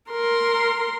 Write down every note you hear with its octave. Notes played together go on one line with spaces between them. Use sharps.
A#4 C6